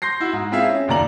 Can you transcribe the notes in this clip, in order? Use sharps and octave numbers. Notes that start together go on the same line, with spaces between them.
C6 G6 A#6 C7
E4 F#4
G#2
C4 E4 F4 G#4 E5 F5
C#4
F#1 D#2 D5 A#5 F#7